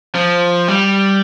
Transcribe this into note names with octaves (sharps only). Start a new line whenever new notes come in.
F3
G3